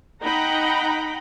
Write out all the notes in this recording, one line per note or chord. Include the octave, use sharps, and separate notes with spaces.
D#4 F#5 G5 A#5 B5